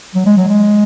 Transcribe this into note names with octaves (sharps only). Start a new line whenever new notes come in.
F#3
G#3
F#3
G#3